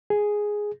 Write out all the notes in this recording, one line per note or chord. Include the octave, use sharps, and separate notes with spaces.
G#4